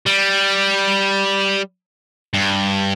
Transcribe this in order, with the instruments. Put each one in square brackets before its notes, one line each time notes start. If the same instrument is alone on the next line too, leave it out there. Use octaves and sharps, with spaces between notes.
[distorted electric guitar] G3
G2